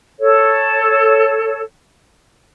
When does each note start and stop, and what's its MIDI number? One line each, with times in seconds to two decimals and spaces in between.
0.19 1.61 69
0.19 1.61 73